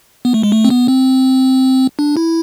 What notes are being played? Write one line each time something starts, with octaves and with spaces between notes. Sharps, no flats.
B3
A3
G#3
A3
C4
B3
C4
D4
E4